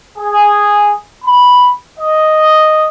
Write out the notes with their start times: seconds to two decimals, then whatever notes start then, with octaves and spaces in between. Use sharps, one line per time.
0.18 G#4
1.24 B5
1.99 D#5